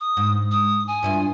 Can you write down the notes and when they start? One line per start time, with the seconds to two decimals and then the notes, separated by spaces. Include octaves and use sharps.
0.01 D#6
0.17 G#2
0.51 D#6
0.87 G#5
1.03 G2 E4 F4